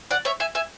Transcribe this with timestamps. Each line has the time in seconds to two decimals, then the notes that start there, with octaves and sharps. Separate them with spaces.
0.11 D5 F#5
0.25 C#5 E5
0.40 E5 G#5
0.55 E5 G#5